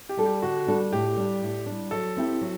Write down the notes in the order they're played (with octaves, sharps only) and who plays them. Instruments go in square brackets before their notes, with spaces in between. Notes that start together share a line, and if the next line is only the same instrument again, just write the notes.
[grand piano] G4
[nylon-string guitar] G3 D4 A4
[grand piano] G4
[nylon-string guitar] D3 [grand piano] F#4
[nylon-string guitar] G3 D4 A4
[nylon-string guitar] A2 [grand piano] G4
[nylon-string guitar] G3 D4
A2
G3 D4
[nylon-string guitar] F#3 [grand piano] A4
[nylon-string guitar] C4 E4 G4
F#3